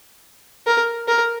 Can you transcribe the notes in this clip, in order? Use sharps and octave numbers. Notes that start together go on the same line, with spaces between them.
A#4
A#4